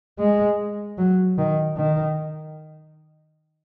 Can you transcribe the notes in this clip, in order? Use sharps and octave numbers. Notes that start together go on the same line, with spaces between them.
G#3
F#3
D#3
D#3